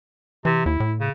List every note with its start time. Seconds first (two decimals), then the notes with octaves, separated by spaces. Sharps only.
0.45 C3 E3
0.66 D#2 E4
0.80 A2
1.00 C#3